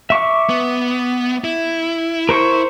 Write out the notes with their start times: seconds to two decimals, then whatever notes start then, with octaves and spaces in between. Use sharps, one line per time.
0.10 E5 C#6 D6
0.49 B3
1.44 E4
2.29 A#4 C5 C#6